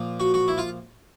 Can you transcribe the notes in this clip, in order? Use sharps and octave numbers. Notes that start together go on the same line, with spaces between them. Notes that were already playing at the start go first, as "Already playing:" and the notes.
Already playing: A#2 F3
F#4
F#4
E4
F4